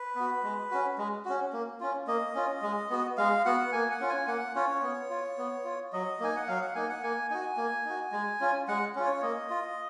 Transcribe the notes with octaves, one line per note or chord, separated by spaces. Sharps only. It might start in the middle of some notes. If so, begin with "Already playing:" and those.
Already playing: B4
B3 F#4
G#3
C#4 F#4
G#3
C#4 F#4
A#3
C#4 F4
A#3 D#5
C#4 F4
G#3
B3 F#4
G#3 F5
B3 F#4 F#5
A#3 G#5
F#5
C#4 F4
G#5
A#3 F#5
C#4 F4 C#5
B3
F4
B3
F4
F#3 D#5
A#3 D#4 G#5
F#5
F#3 F5
F#5
A#3 D#4 G#5
F#5
A#3 G#5
D#4 F#4 G#5
A#3
D#4 F#4
G#3
C#4 F4
G#3 F#5
C#4 F4
C#5
A#3 D#5
F4